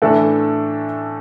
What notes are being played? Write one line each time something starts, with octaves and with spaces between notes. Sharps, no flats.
A2 E3 A3 D4 A4